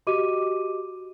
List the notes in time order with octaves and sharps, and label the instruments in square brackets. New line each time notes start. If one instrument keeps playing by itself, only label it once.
[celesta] F#4 G4 D#5 D6 D#7